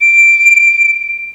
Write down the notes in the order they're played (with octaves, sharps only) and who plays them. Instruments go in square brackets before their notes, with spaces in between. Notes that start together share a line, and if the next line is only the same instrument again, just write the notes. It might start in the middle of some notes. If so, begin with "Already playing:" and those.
[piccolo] D7